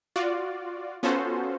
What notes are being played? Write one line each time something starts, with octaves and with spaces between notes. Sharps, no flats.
F4 F#4 D5
B3 C#4 F4 F#4 A4 C5